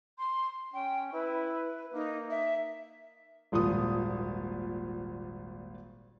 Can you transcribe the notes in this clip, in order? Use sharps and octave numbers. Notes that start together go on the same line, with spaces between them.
C6
C#4 G5
E4 B4
A#3 D#4
E5
D#1 G#1 A#2 F3 D#6